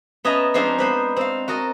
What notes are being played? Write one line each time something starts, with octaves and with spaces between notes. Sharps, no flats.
B3 C#4 D#5 E5 A5 A#5
F3 G#3 C4 D4 D#4 F5
B3 B4 C5
C4 F5
F#4 A#4 D#5 A5